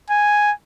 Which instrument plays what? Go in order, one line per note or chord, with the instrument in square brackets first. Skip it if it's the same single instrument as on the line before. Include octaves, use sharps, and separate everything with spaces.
[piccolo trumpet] G#5